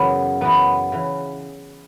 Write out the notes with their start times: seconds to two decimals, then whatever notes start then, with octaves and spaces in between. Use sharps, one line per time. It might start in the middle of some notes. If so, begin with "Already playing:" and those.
Already playing: F#2 C#3 E3 B3
0.41 F#2 C#3 E3 B3
0.92 C#3 E3